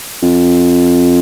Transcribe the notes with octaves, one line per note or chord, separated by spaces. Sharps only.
F2